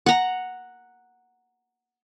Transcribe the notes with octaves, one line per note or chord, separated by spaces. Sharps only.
F#5 A#5